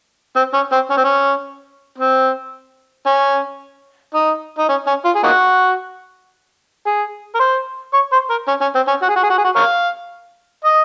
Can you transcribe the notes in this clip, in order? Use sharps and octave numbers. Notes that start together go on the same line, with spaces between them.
C4
C#4
C4
C#4
C4
C#4
C4
C#4
D#4
D#4
C#4
C#4
F4
G#4
A#3 D#4 F#4
G#4
A#4
C5
C#5
C5
A#4
C#4
C#4
C4
C#4
F#4
G#4
F#4
G#4
F#4
G#4
F#4
A#4 C#5 F5
D#5